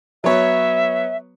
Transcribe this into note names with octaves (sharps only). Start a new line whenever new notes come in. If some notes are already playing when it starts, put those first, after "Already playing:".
F#3 B3 C#5 E5